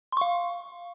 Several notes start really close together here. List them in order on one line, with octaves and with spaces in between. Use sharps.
C6 C#6 F5